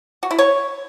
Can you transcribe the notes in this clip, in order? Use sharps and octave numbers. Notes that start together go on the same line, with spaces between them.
F#4
E4
C#5